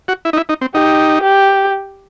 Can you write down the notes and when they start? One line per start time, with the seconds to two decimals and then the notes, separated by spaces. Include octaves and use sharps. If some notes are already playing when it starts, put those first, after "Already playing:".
0.08 F#4
0.25 E4
0.33 D#4
0.37 E4
0.49 D#4
0.61 C4
0.74 D#4 G4
1.23 G4